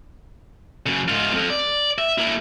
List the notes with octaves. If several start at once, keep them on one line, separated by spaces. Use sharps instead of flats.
F#2 C#3
G#2 F4
F2
D5
E5
A#3 E4